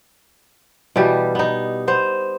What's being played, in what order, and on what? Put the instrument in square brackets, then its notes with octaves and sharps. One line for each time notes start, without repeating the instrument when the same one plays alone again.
[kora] B2 E3 G3 G4
B3 D#4
B3 C5